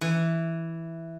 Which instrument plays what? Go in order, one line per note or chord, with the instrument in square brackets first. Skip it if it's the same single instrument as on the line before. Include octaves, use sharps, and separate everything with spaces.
[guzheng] E3